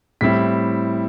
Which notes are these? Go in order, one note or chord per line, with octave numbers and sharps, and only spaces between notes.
A2 G3 C4 E4 B6